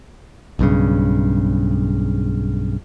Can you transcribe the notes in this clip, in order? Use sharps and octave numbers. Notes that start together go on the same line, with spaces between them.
B1 G2 C#3